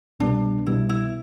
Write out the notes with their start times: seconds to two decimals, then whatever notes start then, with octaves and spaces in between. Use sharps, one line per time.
0.20 C2 B2 G3 B3 D4
0.66 C2 B2 G3 B3 E4
0.89 E4